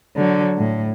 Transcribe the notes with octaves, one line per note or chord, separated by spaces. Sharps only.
D3 F#3
A2